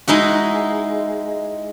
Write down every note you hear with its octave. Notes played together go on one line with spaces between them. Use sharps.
G#3 D#4 E4 F#4